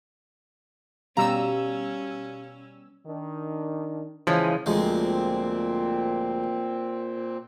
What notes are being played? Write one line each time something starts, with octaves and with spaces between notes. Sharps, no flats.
B2 G3 C#4 G4 F5 A#5 E6
D#3 D4
C#3 E3 F3 G#3
D2 A#2 F3 G#3 C4